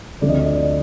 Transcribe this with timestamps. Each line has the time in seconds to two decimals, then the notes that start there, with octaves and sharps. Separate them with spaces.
0.21 D2 D3 F3 A3 C4 D5
0.29 D#5
0.38 D5
0.46 D#5
0.55 D5